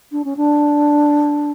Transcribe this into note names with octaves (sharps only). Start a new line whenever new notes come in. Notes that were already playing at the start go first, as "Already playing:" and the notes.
D4
C#4
D4